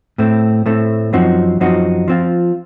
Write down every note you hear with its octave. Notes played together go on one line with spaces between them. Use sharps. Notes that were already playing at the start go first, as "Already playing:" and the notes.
A2 A3 C4
A2 A3 C4
F#2 F3 C4 D#4 F#4
F#2 F3 C4 D#4 F#4
F3 C4 F4